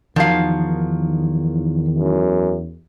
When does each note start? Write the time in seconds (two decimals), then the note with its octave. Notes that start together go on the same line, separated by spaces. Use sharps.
0.16 E2 D#3 F3 F#3 F5
1.98 F#2